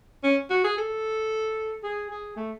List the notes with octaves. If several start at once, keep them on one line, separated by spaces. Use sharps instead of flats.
C#4
F#4
G#4
A4
G#4
G#4
A3